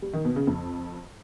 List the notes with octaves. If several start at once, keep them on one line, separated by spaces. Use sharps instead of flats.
G3
D#3
B2
C#3
F2